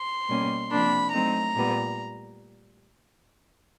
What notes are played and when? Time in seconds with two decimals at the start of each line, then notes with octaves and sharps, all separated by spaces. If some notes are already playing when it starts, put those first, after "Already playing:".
Already playing: C6
0.29 B2 G3 A#3 C#4
0.71 C3 F3 A#3 D4 B5
1.13 F#3 A3 C4 D#4 A#5
1.55 A#2 G3 B3